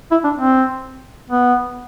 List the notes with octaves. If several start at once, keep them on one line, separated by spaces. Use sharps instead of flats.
E4
D4
C4
B3